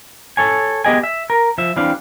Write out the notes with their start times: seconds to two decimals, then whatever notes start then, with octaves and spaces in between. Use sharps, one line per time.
0.37 A4 C#5 G#5
0.85 B3 G4 G#4 D#5 G5 G#5
1.03 E5
1.30 A#4
1.58 F3 E5
1.76 E3 G3 C4 D4 F5